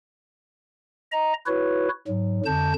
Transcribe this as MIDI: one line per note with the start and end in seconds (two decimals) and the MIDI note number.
1.12 1.33 75
1.12 1.33 82
1.46 1.89 64
1.46 1.89 66
1.46 1.89 71
1.46 1.89 73
2.07 2.40 44
2.07 2.40 54
2.46 2.73 41
2.46 2.73 50
2.46 2.73 81
2.46 2.73 91